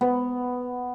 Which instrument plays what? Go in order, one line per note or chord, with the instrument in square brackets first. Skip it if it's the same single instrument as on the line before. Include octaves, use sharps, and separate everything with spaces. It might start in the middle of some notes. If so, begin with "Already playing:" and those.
[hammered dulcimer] B3